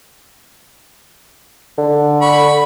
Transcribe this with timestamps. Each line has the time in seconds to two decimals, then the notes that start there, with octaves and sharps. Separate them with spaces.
1.78 D3
2.22 B5 C#6